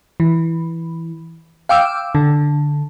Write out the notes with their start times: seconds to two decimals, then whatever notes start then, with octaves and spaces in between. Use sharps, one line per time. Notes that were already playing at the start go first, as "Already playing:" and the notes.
0.20 E3
1.69 F5 G5 D6 E6
2.15 D3